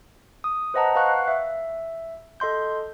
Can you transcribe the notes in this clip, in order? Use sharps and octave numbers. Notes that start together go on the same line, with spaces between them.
D#6
B4 C5 D#5 F#5 A5 A#5
B4 F5 F#5 C#6 F#6
E5
A4 D#5 C6 G6